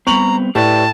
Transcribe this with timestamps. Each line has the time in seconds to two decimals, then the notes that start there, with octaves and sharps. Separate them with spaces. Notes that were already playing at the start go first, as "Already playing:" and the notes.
0.07 G3 B3 C4 A#5 C#6 F7 F#7
0.55 A2 G4 B4 D5 A5